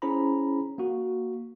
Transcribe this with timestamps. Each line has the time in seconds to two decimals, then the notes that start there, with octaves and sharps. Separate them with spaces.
0.02 C#4 E4 G#4 C5 A#5 B5
0.78 A#3 F#4